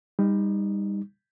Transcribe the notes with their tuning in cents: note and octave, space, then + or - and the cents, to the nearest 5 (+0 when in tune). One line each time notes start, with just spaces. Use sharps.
G3 +30 D#4 +0